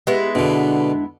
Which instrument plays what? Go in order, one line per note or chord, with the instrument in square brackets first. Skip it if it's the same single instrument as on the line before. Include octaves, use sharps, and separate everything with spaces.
[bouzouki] G#3 B3 E4 [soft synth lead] G4
[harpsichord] B2 D3 [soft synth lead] D4